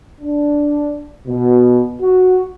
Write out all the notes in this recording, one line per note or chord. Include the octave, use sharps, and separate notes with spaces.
D4
B2
F#4